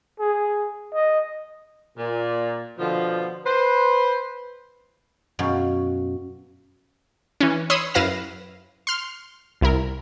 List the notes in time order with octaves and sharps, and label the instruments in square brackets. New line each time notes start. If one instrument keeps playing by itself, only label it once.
[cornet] G#4
D#5
[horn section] A#2
B2 D3 F3
B4 C5
[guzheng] F#2 B2 F5
[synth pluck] E3 C#4
C#5 B5 C6 D#6 E6
F#2 E4 B4 F5 A#6 E7
C6 F6
C2 E4 A#4